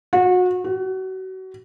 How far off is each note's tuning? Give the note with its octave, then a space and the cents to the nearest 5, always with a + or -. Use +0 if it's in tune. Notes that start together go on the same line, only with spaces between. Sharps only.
F#4 -30
F#4 +30